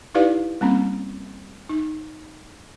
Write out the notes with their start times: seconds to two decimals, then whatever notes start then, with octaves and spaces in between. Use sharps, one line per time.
0.15 D#4 E4 G4 B4 D5 F5
0.61 G3 A#3 C4 C#4
1.69 D#4